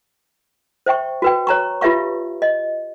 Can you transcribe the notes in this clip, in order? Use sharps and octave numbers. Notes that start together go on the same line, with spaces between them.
C5 E5 G5 C#6
F#4 B4 G5
C#5 A#5 C#6
F4 G4 B4 E5 F5 C#6
D#5